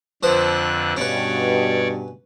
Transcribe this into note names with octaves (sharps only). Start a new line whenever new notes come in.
F2 D3 F3 B4 C5 F#6
G2 B2 C#4 B4 C#5 D5